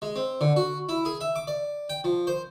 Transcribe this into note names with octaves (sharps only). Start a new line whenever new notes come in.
G#3
C4
D3
F#4
E4
G#4
E5
D6
D5
G5
F3
C5